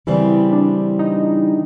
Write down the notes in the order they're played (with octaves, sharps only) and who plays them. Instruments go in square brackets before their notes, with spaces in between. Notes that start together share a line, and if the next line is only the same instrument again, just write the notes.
[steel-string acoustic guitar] C#3 E3 G3 C4 [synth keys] E4
[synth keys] D4
D#4